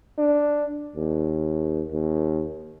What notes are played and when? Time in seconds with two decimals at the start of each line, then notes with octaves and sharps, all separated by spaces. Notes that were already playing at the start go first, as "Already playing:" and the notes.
0.18 D4
0.96 D#2
1.92 D#2